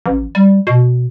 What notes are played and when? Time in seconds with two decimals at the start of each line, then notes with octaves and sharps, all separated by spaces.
0.06 A1
0.35 G3
0.67 B2